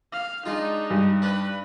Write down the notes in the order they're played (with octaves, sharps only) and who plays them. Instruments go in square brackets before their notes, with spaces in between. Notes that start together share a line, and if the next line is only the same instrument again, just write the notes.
[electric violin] F5
[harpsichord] G#3 F4 [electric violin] D4 D#4
[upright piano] G2
[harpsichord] D4 [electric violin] B4